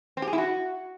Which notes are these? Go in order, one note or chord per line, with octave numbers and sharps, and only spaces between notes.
C4
G4
G#4
E4
F#4